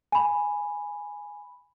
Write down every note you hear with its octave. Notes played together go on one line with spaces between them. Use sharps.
G#5 B5